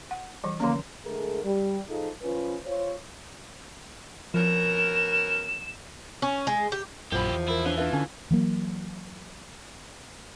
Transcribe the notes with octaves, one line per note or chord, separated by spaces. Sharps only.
F#5
E3 G3
D3 F3 A#3 C#4
D3 G#3 A3 G#4 A#4
G3
F3 D#4 F4 G#4 A4
F3 C#4 F4 B4
F4 C5 C#5
B2 F3 C#4 A#4 E7
C#4
G#3
G4
A#1 F#2 E3 F3 G4 C5 B5
E2
E4 F4 A#4
E3 D4 C#5 F5
D4 F4 B4 E5
D3 C#4
E3 F#3 A#3